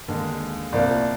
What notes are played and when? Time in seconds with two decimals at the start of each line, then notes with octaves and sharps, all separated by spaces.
0.08 D#2 D3 G#3
0.72 C2 A#2 F3 A#3 F4 D5